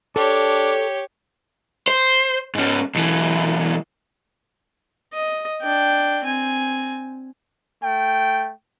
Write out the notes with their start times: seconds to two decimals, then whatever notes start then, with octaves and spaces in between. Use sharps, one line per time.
0.16 D4 G4 A4 C#5
1.88 C5
2.55 G#2 C#4
2.95 B1 E3
5.13 D#5
5.62 D4 G5
6.25 C4 G#5
7.83 A3 G5